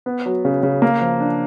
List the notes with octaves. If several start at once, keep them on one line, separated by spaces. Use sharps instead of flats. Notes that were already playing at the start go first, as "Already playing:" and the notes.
B3
F#3
C#3
C#3
A#3
F3
D4